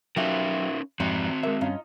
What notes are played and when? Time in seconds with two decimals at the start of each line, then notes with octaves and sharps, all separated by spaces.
0.17 F3 F#3 C#4 D#4 E4 F#4 G4 A#4
1.00 F2 G#2 E3 G3 C4 F#4 A#5
1.43 G#3 A#3 E5
1.61 G2 C#4 D#4 F4